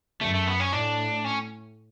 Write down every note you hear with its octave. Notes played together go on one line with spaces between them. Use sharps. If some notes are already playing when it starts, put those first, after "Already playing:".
F#2 A3
A3
B3
C#4
A2 D4
C#4